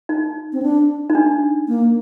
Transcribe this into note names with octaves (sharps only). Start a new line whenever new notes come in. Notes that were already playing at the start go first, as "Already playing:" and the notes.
D#4
C4
D4
D#4
D4
A#3